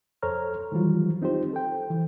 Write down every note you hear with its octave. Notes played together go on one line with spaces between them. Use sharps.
F2 A4 C5 C#5 A#5 F6
D#3 E3 F#3 G3 F4
C4 D#4 F4 G4 C5
A4 G5
E3